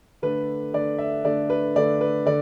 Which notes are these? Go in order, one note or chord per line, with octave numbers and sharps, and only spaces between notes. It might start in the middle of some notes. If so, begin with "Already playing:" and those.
D3 A3 D4 B4
D3 A3 D4 D5
E5
D3 A3 D4 D5
B4
D3 A3 D4 D5
B4
D3 D5